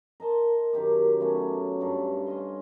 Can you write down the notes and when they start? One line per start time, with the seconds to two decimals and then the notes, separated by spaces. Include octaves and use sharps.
0.20 A#4 D#5 A5 C6
0.73 F#2 D#3 G4 D6
1.20 F#3 A3 B3 C#4
1.80 G2 A4 A#5
2.26 C#4 F4 D#5 C6